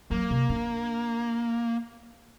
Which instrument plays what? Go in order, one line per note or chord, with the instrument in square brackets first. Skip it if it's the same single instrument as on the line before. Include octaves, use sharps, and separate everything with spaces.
[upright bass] F#3 [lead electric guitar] A#3
[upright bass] C3
D4